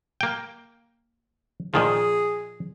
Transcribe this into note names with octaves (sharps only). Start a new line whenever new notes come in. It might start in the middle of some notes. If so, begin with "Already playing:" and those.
A#3 G5
A#2 D#3 F3 G#4